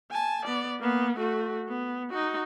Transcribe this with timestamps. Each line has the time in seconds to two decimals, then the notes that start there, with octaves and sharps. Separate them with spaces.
0.11 G#5 A5
0.46 B3 D5
0.80 A#3 B3
1.17 A3 F#4
1.68 B3
2.10 D#4 F#4